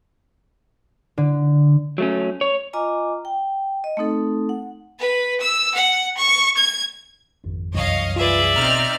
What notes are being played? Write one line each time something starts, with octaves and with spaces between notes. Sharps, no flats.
D3
F#3 A3 C#4
C#5
F4 D#5 G#5 A#5 D6
G5
D#5
A3 C4 D#4 A4
F#5
B4
E6
F#5
C#6
G#6
G#1 F2
C2 F#2 E3 C#5 D#5 F5
F4 G#4 B4 D5 E5
G#1 B2 C4 D#4 A#5 F6